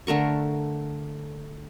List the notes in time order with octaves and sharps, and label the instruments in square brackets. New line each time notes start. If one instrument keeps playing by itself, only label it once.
[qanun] D3 A3 A#4 C#6